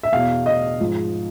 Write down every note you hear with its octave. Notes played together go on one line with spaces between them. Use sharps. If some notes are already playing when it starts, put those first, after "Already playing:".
E5
E2 B2 F5
D#5
G#2 F3